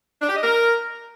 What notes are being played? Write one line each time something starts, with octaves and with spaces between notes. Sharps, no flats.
D4
G4
D#5
A#4